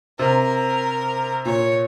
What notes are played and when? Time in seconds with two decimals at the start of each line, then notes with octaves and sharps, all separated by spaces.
0.19 C3 A#4
1.45 A#2 C#5